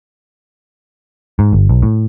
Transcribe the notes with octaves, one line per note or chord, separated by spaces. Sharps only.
G#2
G1
B1
A2